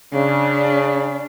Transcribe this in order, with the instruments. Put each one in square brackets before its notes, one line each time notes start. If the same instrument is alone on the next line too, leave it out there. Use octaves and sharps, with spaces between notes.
[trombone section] C#3 [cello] D4